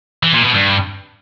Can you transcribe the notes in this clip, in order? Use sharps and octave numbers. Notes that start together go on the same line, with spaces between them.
E3
A#2
B2
G2